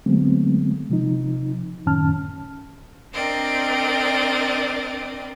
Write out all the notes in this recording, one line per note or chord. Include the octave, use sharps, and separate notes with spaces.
D3 F#3 G#3 A3 B3 C4
C3 F3 D#4
F#2 A2 D#3 C#4 A5 F6
C4 D4 A#4 D5 D#5 G5